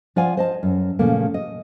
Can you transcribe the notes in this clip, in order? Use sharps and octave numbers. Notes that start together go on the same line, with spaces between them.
F3 F4 D5 F5 F#5 G#5
C5 D#5 A5
F#2
A#2 C#3 F3 A3 A#3
D#5